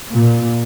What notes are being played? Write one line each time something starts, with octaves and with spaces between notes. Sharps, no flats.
A#2